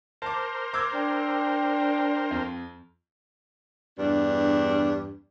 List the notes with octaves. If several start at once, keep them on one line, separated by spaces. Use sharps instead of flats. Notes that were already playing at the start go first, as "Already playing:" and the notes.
A#4 C5 A5 D6
D6 E6 G#6
D4 G5
F2
E2 G2 D4